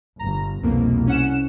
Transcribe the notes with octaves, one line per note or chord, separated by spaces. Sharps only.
G1 A#5
C2 F2 B2 A#3
C#4 F#5 E7